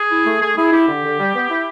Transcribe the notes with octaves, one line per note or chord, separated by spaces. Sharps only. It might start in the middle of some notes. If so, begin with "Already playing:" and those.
Already playing: G#4
E4
A3
A3 G#4
E4 G#4
E4 G4
D3
D3
G3
B3
E4